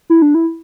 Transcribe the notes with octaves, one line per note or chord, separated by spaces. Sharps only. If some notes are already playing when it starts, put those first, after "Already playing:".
E4
D4
E4